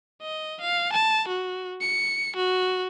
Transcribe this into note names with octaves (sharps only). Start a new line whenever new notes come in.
D#5
F5
A5
F#4
C#7
F#4